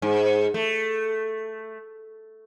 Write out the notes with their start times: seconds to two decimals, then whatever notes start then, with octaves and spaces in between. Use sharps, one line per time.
0.02 G#2
0.54 A3